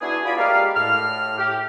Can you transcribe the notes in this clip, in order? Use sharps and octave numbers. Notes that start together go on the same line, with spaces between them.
B3 D4 E4 F#4 G#4
F4 D5 B5
G#3 A#3 G4 A#4 D5 F5
A2 F6
G4